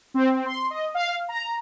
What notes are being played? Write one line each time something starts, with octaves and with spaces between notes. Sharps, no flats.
C4
C6
D#5
F5
A#5